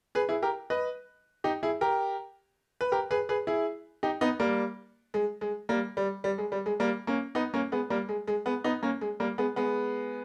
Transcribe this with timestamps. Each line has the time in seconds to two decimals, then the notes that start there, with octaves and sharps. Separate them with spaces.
0.15 G#4 B4
0.29 E4 G#4
0.42 G4 A#4
0.70 B4 D#5
1.44 D#4 G4
1.63 E4 G#4
1.81 G4 A#4
2.81 B4
2.92 G4 A#4
3.11 G#4 B4
3.29 G#4 B4
3.47 E4 G#4
4.03 D#4 G4
4.21 B3 D#4
4.40 G3 A#3
5.14 G#3
5.41 G#3
5.69 G3 A#3
5.97 G3
6.24 G3
6.38 G#3
6.52 G3
6.66 G#3
6.80 G3 A#3
7.07 A#3 C#4
7.35 B3 D#4
7.54 A#3 C#4
7.72 G#3 B3
7.90 G3 A#3
8.09 G#3
8.28 G#3
8.46 G#3 B3
8.64 B3 D#4
8.83 A#3 C#4
9.01 G#3
9.20 G3 A#3
9.38 G#3 B3
9.56 G#3 B3